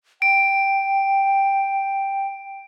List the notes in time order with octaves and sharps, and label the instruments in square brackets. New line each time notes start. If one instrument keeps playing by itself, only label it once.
[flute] G5 [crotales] D7